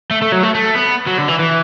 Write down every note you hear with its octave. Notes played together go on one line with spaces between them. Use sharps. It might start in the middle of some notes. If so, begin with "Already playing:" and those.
A3
A3
F#3
A3
A3
B3
F#3
D3
E3
E3